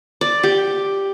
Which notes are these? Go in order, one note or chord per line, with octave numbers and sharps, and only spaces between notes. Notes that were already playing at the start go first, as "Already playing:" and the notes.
D5
G4